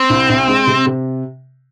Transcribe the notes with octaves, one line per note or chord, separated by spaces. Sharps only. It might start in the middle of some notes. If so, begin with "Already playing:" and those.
Already playing: C4
C2
C2
G#3
C3
C3